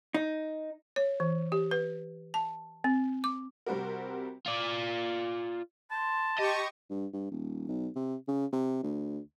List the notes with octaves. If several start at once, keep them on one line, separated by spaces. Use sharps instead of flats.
D#4
C#5
E3
G4
B4
A5
C4
D6
C3 G3 C4 F#4 G4 A#4
F4 D5
A5 C6
G4 D#5 C#6
G2
G2
D#1
B1
C3
C#3
C3
D2